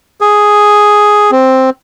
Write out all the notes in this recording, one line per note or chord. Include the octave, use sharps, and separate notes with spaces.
G#4
C4